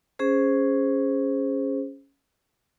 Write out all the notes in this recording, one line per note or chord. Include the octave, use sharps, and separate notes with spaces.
C#4 G#4 C5